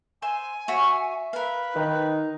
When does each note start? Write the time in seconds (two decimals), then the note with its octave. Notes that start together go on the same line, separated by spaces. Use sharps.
0.22 C5 E5 G#5 C6
0.68 F#4 C#5 E5 C#6
1.33 A#4 B4 F5
1.76 D#3 D#4